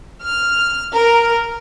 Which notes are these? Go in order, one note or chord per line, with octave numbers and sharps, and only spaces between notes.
F6
A#4